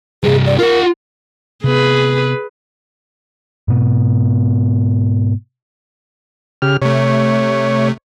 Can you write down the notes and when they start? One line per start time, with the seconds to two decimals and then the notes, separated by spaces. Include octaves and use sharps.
0.23 G2 C3 G#4
0.46 D5
0.59 F4 A#4 F#5
1.64 C3 B3 G#4 B4
3.68 G#2 B2 B3
6.62 C#3 G4 F6
6.82 C3 A3 C#5